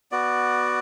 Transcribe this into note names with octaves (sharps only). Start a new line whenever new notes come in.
B3 F#4 D5